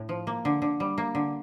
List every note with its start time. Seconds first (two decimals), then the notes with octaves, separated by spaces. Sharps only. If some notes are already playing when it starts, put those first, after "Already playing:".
Already playing: A2
0.09 F3
0.27 A#3
0.45 D3
0.62 D3
0.80 G3
0.98 A#3
1.15 D3